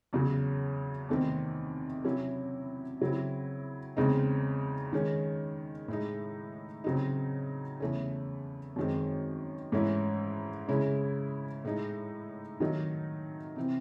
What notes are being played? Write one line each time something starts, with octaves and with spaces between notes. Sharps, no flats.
E2 C#3 F#3
E2 C3 D#3 A3 C4
C3 F#3 C#4 E4
C#3 F#3 C4 E4
E2 C#3 G#3 C4 D#4
D#3 G#3 C#4
A2 G#3 D#4
C#3 F#3 C4 D#4
E2 C#3 E3 A3 C#4
F#2 D#3 G#3 C4
G#2 E3 A3 C#4 E4
C#3 G#3 C#4 E4
A2 G#3 D#4
D#3 F#3 A3 D#4
C3 E3 C4